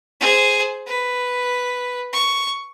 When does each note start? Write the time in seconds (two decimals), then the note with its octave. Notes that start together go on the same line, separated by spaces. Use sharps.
0.20 G#4 C5
0.87 B4
2.12 C#6